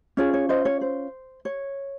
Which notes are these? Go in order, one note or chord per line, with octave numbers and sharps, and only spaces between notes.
C#4 F4 G#4 C#5
C#5
C5 D#5
C#5
C5
C#5